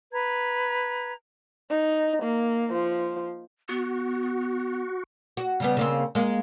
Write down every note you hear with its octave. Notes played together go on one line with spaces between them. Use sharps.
B4 A#5 G#6
D#4
A#3
F3
B3 F#4
F#4
C#3 G3 B3
C#3 A#3 C4
G#3 A#3